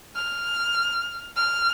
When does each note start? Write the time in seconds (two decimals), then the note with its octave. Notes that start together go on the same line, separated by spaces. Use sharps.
0.16 F6
1.36 F6